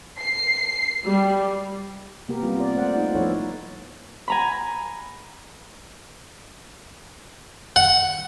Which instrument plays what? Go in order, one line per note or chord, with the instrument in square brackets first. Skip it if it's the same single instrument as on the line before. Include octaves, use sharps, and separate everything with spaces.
[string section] C7
G3
[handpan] C3 A#3 B3 G4 A#4
G3 F4
D5
A3 C5 F#5
D#4 F4
F3 A3 B3 E4 A4 C#5
[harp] G#5 A#5 B5
[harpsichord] F#5